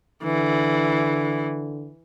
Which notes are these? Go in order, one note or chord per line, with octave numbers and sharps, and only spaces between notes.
D3 E3